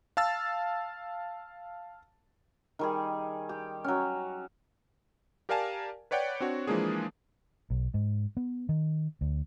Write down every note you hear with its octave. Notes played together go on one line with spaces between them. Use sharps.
F5 A5 E6 A6
D#3 G3 G#4
G4
F#3 C#4
G4 A#4 D5 F5 G#5 A5
B4 C#5 D5 F#5 G5
C4 D4 F#4 C#5
E3 F3 G#3 A#3 D4 G#4
B1
G#2
B3
D#3
D2